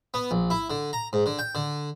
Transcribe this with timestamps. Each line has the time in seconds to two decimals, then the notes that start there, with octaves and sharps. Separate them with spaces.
0.14 B3
0.31 A#1
0.50 E4
0.70 D3
0.93 A#5
1.13 G#2
1.26 D3
1.39 G5
1.55 D3